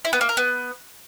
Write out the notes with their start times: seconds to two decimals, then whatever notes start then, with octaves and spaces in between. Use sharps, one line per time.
0.05 E4
0.13 B3
0.21 A#3
0.29 A#4
0.37 B3